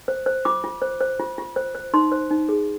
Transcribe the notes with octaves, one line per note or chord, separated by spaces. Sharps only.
C5
C5
F4 D6
F4
C5
C5
F4
F4
C5
C5
D#4 C6
C5
D#4
G#4